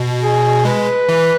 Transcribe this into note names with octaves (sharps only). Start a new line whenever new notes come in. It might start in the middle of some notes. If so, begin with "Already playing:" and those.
Already playing: B2
G#4
G#3 B4
E3